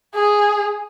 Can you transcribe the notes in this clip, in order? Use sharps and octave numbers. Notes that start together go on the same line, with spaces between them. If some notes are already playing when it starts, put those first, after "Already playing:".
G#4